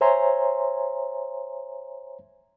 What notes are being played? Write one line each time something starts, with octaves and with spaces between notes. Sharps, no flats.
C5 C#5 E5 G#5 A#5 C6